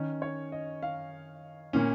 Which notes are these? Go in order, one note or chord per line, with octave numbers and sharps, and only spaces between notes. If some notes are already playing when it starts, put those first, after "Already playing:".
Already playing: D#3 C#4
C#5
D#5
F5
A#2 A#3 C#4